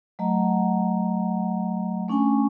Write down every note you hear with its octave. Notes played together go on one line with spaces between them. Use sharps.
F#3 A3 D#5 F#5 A#5
A3 C#4 D4 G#5 C#6